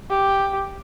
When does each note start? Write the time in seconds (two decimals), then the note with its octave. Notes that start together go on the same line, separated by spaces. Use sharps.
0.10 G4